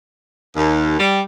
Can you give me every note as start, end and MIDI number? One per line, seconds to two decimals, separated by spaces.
0.56 0.94 39
0.99 1.20 55